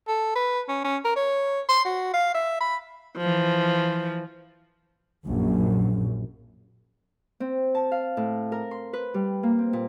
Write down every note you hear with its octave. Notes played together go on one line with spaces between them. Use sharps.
A4
B4
C#4
C#4
A#4
C#5
C6
F#4
F5
E5
B5
E3 F3
A#1 F#2
C4
A5
F5
A2
A#4
C6
B4
G3
A#3
C4
A#2